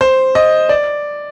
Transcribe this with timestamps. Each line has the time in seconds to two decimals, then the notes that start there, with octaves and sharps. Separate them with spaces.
0.01 C5
0.35 D#5
0.69 D5